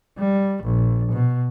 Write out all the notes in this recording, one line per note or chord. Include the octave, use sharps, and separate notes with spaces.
G3
A#1
B2